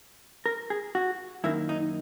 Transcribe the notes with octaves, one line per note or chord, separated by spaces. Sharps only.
A#4
G#4
F#4
F#2 D#3 A#3 E4
D#4